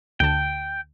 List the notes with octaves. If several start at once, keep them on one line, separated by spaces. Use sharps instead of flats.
D2 D3 G5 A5